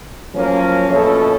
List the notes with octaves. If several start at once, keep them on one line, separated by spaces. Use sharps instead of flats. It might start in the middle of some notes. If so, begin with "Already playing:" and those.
F3 F#3 A3 A#3 C#4
A#1 F2 B2 A3 C#4 A4